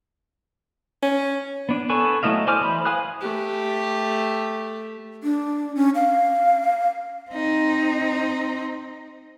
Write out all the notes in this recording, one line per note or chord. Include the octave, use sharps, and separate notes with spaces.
C#4
B3 D4
B3 A4 B4 G#5 C#6
F#3 A3 E4 D#5 F5
C5 D5 G#5 D6 F6
E3 C5 B5
B4 F5 G#5 D#6 F#6
A3 G4
D4
C#4
F5
C4 D#4